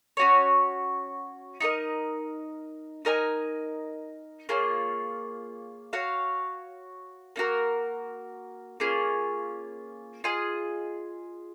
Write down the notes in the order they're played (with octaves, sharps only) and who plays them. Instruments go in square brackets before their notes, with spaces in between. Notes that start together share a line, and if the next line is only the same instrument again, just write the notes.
[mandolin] C#4 F#4 C#5
D#4 F#4 A#4 D#5
D#4 A#4 D#5 G#5
A#3 F4 G#4 C#5
F#4 C#5 F5
A#3 D#4 F#4 A#4
A#3 C#4 F4 G#4
F4 G#4 D#5